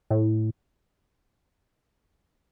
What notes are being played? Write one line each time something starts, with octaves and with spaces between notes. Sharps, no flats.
A2